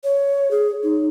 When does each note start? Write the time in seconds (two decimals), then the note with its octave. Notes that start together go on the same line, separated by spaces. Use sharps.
0.04 C#5
0.51 G#4
0.83 D#4